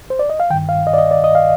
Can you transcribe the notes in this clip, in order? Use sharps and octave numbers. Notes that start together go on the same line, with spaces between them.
C5
D5
D#5
F5
G2 D#3 G5
F5
D#5
D5
D#5
D5
D#5
F5